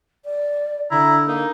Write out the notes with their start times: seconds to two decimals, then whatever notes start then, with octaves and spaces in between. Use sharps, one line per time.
0.25 D5
0.91 D3 E4 A#5
1.28 A#3 D#4